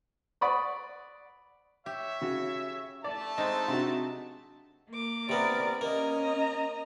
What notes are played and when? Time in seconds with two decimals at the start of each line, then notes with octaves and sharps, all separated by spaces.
0.41 D5 F#5 B5 C#6 D#6
1.86 G4 C#5 E5
2.21 C#3 F#4
3.04 A3 D5 A5
3.38 G#3 C4 D#4
3.68 C3 D4 F#4
4.90 A#3 D6
5.29 C3 B3 A#4 D5
5.81 A#3 C#4 D#5 A#5